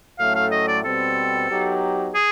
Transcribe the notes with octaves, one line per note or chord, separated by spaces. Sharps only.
A2 F#3 A3 C#4 F5
F5
D#5
D5
B2 G3 C4 A4
F#3 B3 D#4 G4
G#4